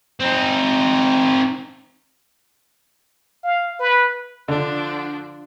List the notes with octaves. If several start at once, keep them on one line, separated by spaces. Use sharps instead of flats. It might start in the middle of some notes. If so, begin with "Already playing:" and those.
C4 D#4
F5
B4
D3 F3 D4